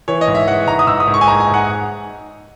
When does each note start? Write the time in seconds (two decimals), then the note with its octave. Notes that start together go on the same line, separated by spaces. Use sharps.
0.08 E3 C#5
0.21 D#5
0.27 G#2
0.35 E5
0.47 E3 F#5
0.67 G#2 A#5
0.79 D#6
0.87 G#2 E6
1.00 D#6
1.07 G#2
1.14 C#6
1.21 G#5
1.27 G#2 A#5
1.40 G#5
1.47 G#2
1.54 F#5